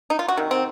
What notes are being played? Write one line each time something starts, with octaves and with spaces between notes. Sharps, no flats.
D#4
F4
F#4
C3 D#3
C4